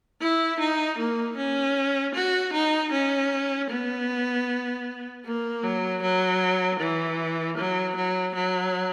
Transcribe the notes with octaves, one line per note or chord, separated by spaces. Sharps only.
E4
D#4
A#3
C#4
F#4
D#4
C#4
B3
A#3
F#3
F#3
E3
F#3
F#3
F#3